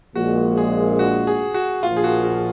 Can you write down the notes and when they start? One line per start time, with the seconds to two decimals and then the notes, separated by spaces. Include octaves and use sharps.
0.15 A#1 A#2 G#3 F#4
0.57 G#4
0.99 F#4
1.27 G#4
1.54 F#4
1.83 A#1 A#2 F3 F4
1.97 G#4
2.04 F#4
2.24 F#4